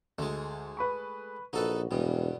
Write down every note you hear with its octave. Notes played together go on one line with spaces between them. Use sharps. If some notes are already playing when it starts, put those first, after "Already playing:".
D2 G#3 A3
B4 B5 C#6
A#1 D#4 F#4 A4 B4
E1 G2 B2